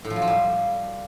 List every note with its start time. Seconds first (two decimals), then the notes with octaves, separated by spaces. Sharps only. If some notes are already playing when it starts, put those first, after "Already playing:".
0.05 A2
0.10 F3
0.16 F#3
0.22 F3
0.27 G3